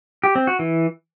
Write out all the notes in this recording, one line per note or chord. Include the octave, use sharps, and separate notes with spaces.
G4
C4
F#4
E3